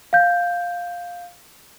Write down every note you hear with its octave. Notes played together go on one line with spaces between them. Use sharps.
F5 G6